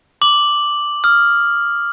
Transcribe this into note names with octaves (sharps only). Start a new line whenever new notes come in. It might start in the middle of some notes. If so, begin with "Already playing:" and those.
D6 F#7
D#6 F6